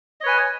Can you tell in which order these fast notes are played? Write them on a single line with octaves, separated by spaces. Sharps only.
D#5 C#5 B4 G#5